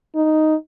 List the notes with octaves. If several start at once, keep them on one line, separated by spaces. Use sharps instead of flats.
D#4